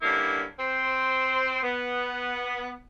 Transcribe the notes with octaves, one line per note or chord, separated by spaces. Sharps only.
G2 D3 A#3 C#4 E4
C4 C5
B3